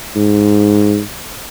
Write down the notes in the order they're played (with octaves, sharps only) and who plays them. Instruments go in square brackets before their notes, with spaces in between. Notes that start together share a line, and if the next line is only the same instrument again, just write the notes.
[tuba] G#2